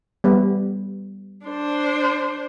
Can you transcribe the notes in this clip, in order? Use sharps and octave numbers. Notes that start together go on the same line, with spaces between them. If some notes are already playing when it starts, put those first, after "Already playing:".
G3 B3
D4 C5